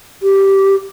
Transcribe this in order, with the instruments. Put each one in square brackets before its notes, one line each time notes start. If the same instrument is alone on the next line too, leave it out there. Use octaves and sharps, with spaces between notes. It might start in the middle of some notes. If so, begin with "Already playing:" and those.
[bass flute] G4